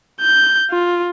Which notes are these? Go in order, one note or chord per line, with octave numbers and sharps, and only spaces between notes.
G6
F4